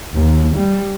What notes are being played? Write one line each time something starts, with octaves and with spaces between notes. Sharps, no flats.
D#2
G3